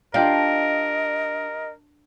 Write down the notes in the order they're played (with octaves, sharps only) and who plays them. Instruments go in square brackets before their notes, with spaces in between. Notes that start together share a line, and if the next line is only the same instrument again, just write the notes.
[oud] D4 [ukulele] F4 G4 F5 [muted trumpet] A#4 [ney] D#5